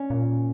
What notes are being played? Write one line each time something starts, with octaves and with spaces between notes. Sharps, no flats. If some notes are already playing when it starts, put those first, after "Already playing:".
Already playing: C#4
A#2